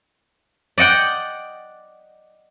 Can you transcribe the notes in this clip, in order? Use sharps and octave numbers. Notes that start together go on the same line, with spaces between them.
D5 D#5 F#5 G5